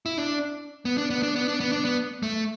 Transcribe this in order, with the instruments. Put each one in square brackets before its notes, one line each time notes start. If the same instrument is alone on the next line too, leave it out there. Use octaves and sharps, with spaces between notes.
[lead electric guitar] E4
D4
B3
D4
B3
D4
B3
D4
B3
D4
B3
A3